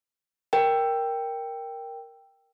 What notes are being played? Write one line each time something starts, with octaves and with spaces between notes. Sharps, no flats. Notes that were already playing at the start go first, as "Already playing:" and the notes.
A#4 G5